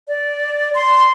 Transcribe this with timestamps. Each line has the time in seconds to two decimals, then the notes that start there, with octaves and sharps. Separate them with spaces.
0.08 D5
0.74 C6